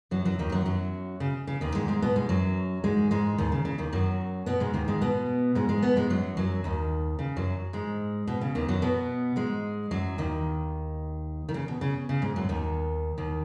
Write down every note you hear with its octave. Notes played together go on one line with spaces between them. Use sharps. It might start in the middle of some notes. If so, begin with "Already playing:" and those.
F#2 F#3
F#2 F#3
D#2 D#3
F#2 F#3
F#2 F#3
C#3
C#3
D#2 D#3
G#2 G#3
G#2 G#3
B2 B3
G#2 G#3
F#2 F#3
G#2 G#3
G#2 G#3
D#2 D#3
C#3
C#3
D#2 D#3
F#2 F#3
B2 B3
G#2 G#3
D#2 D#3
G#2 G#3
B2 B3
G#2 G#3
G#2 G#3
B2 B3
G#2 G#3
F#2 F#3
F#2 F#3
D#2 D#3
C#3
F#2 F#3
G#2 G#3
B2
C#3
D#2 D#3
F#2 F#3
B2 B3
G#2 G#3
F#2 F#3
D#2 D#3
D#3
C#3
B2
C#3
C#3
G#2 G#3
F#2 F#3
D#2 D#3
D#2 D#3